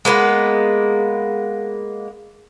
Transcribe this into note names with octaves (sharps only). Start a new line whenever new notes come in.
G#3 A#3 B3